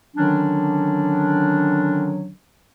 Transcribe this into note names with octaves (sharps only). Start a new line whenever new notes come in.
D3 D#3 F#3 C#4 D4